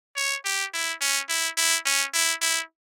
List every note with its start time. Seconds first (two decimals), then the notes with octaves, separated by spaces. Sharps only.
0.16 C#5
0.45 G4
0.73 E4
1.01 C#4
1.29 E4
1.57 E4
1.85 C#4
2.13 E4
2.41 E4